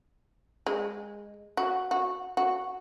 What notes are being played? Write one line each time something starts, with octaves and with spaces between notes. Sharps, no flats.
G#3
F#4
F#4
F#4